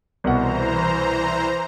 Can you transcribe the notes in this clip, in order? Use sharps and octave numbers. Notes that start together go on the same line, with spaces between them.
C2 B2 E3 C5 F#5 A#5